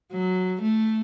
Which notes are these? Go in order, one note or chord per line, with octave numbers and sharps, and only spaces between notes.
F#3
A3